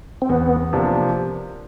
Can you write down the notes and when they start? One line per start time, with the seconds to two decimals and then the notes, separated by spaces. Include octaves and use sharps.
0.22 C4
0.29 E2 B3
0.73 C3 F3 A#3 D4